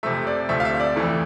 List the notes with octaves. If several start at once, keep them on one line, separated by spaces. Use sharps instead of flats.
F2 C3 F3 A3 E5
D5
D2 C3 F3 A3 E5
F5
E5
D5
F2 E3 A3